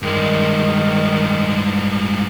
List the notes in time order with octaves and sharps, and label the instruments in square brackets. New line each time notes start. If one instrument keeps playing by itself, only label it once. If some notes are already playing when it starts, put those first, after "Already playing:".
[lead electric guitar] G2 G#3 [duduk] D#3